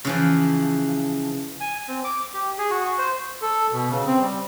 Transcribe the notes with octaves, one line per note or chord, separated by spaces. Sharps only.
C#3 E3 F3
G#5
C4
D6
G4
G#4
F#4
C5
A4
B2
C#3
C4
G3